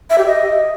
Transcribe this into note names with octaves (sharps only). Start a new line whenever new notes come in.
E5
G4
D#5